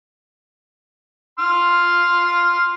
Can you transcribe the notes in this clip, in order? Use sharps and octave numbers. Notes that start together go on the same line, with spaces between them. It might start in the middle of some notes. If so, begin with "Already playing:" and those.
C6 F6